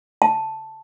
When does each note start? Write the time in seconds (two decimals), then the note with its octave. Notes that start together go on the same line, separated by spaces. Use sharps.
0.22 A5